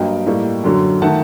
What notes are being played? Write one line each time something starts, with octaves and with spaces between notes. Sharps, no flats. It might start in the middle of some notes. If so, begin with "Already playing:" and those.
Already playing: G2 F#3 A#3 D#5 G5
A2 G3 A#3
F#2 D3 F#3
D#3 A3 F#5 A5